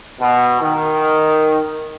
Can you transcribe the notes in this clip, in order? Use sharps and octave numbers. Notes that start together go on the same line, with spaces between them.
B2
D#3